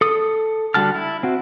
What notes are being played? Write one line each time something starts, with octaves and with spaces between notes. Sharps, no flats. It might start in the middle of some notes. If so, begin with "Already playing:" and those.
A4 D#6
D3 G3 F#4 A5 F6
E4
C4 F#4